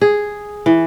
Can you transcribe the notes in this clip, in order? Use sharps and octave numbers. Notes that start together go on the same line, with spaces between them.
G#4
E3